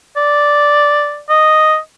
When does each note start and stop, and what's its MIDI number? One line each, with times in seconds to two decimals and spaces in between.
0.16 1.20 74
1.29 1.77 75